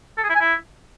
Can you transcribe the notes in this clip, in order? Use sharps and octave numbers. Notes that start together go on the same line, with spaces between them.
A4
G#4
E4
G#5
E4